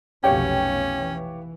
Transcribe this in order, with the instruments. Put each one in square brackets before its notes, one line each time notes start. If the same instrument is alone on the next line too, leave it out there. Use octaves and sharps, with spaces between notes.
[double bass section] F1 B1 B2 [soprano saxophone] C#4 [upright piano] G4 C#5 F5 [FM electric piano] G5
[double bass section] E3